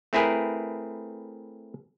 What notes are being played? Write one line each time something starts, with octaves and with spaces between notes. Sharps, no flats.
A3 C4 E4 G#4 A#4 B4